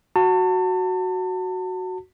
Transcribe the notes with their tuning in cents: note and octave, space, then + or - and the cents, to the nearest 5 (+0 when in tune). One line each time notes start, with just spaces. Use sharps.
F#4 +0 A5 +35